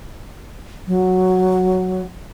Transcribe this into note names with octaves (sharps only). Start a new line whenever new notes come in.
F#3